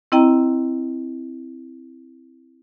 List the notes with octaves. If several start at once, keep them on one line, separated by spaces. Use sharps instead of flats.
C4 E4 D#5 G5 A#5